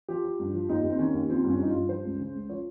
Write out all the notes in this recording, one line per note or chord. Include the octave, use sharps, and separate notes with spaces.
F3 G4
F3
G2
F3
D#2 D#4
D#2
C4
D#3 C#4
D#2
F3 C4
G2
C#4
G2 D#4
F4
G2
F3 C5
C#2
C#3
C#2
F3 C#5